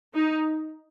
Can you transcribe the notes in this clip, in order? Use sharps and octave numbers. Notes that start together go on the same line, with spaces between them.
D#4